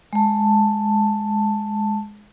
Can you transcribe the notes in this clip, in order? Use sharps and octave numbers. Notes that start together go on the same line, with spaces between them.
G#3 A5